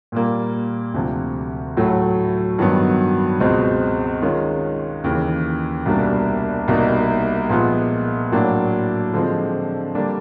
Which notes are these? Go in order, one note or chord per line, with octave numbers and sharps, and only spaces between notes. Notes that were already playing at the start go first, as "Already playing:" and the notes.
A#2 G3 A#3
D2 C3 F3
A2 F#3 A3
G2 D#3 F#3 B3
C#2 B2 G#3 C4
D#3 G#3 C#4 F4
D#2 C#3 E3
C2 B2 G3 A#3 D4
C2 B2 G3 A#3 D#4
A#2 F3 G#3 B3
A2 F#3 A#3 D4
D3 F3 G#3 C4
D3 G3 A#3 D4